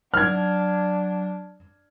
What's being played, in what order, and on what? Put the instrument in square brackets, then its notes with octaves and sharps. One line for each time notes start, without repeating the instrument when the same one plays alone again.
[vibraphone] F#3 [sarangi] D4 [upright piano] F6 G#6